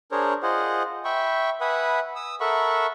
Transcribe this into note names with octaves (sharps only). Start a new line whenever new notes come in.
D4 G#4 A#4 C5 C#5
F4 G#4 C5 D#5 F#5
E5 G5 B5 C#6
B4 E5 F#5 G#5 B5 D#6
D#6 E6
A4 A#4 E5 F#5 B5 C#6